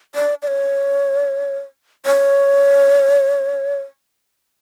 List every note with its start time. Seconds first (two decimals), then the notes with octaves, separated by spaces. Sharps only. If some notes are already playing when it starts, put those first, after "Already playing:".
0.15 D5
0.42 D5
0.47 C#5
2.06 C#5